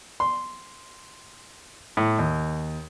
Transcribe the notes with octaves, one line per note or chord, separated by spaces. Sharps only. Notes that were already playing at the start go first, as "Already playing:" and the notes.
C6
A2
D#2